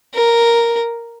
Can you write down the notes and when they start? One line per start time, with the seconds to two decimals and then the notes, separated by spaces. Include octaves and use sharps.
0.14 A#4